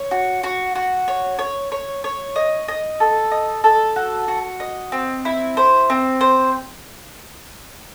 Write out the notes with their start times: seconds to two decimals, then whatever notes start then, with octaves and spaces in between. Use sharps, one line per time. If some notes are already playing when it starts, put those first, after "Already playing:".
Already playing: C#5
0.11 F#4
0.43 F#4
0.75 F#4
1.08 C#5
1.39 C#5
1.72 C#5
2.04 C#5
2.36 D#5
2.68 D#5
3.00 A4
3.31 D#5
3.64 A4
3.96 F#4
4.28 F#4
4.60 D#5
4.92 C4
5.25 E4
5.57 C5
5.90 C4
6.21 C5